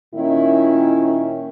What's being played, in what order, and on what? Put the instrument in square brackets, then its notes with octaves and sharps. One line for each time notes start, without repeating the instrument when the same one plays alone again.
[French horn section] A#2 D#3 A#3 C#4 E4